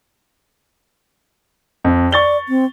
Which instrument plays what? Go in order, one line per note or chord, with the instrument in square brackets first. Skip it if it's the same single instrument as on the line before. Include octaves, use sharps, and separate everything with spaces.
[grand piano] F2
[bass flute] D5 [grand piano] C#6 A6 G7
[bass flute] C4